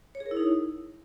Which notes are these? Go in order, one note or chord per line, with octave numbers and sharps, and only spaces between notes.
C#5
G#4
A#4
E4
D#4